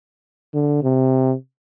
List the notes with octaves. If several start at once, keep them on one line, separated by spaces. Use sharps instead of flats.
D3
C3